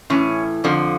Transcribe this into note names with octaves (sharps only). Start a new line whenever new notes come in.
A2 E3 C#4
F2 D3 F3